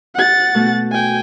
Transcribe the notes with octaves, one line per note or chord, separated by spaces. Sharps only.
F#5 A6
B2 A3
G5 G#5